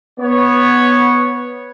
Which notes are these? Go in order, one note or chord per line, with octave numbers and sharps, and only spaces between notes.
B3 C#5